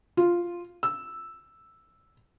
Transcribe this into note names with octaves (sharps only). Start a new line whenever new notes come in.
F4
E6